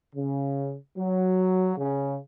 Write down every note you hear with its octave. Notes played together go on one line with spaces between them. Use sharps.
C#3
F#3
C#3